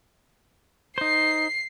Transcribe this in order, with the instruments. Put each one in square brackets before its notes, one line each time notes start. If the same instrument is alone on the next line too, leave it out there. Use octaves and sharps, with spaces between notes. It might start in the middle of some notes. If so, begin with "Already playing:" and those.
[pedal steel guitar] D#4 C5 [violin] C7